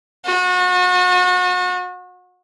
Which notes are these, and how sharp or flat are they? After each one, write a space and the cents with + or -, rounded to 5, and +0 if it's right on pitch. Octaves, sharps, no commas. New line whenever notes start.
F#4 -35